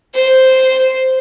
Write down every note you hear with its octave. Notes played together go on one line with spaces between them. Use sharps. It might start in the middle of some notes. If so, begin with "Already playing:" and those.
C5